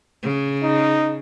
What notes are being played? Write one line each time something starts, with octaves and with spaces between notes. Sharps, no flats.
C#3
D#4